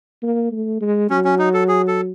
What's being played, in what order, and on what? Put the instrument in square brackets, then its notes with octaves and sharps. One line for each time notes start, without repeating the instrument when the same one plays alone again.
[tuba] A#3
A3
G#3
[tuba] F#3 [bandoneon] C#4
[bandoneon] C#4
D#4
A4
G#4
A4